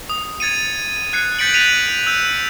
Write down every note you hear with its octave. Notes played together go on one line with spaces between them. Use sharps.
D#6
G#6 A6 C#7 D#7
F#6 G#6 C7 C#7
G6 A6 B6 C#7 D7 F#7
G6 B6 C#7 D#7 F7 F#7
E6 G6